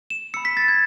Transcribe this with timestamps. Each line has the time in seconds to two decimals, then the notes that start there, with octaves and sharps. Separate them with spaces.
0.10 E7
0.34 B5 E6 C#7
0.45 B6
0.57 A6
0.68 G#6